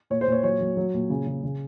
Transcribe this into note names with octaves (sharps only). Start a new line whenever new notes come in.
A#2 C#5
C5
A#2 C#5
F#3 C#5
F#3
F#3
A#2
C#3
C#3
C#3